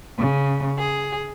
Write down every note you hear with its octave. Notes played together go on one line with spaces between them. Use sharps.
C#3
G#4